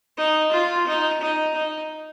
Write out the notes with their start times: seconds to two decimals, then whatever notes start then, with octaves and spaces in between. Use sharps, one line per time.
0.18 D#4
0.52 F4
0.87 D#4
1.21 D#4
1.55 D#4